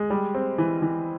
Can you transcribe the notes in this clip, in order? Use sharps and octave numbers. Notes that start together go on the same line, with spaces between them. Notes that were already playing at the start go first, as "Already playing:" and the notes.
Already playing: G#3
G3
C4
E3
E3